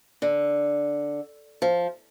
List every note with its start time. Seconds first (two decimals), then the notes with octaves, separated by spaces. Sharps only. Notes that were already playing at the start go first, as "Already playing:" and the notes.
0.22 D3
1.62 F3